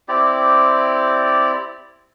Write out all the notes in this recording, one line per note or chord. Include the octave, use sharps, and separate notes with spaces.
C4 E4 G4 D5